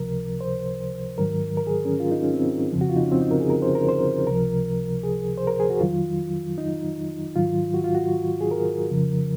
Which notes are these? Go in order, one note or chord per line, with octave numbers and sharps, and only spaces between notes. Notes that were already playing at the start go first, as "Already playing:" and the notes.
Already playing: C#2 C3 F3 A#4
C5
G#2 D#3 F#3 A#4
A#4
G#4
C#4
F4
D#4
C#4
C4
F2 C#3 F3
F#4
F4
D#4
C#4
C4
D#4
A#4
G#4
A#4
C5
A#4
C5
C#2 C3 F3 A#4
G#4
C5
A#4
G#4
F#4
F2 D#3 F#3 F4
D#4
G#2 D#3 F#3 F4
F#4
F4
F#4
G#4
A#4
F2 C#3 F3